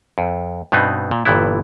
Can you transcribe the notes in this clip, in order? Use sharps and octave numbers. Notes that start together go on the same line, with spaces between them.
F2
G2 B2 B3 C4 D#4
A#2
G1 G2 A#2 E3 B3 E4